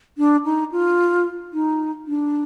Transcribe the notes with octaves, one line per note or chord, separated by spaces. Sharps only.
D4
D#4
F4
D#4
D4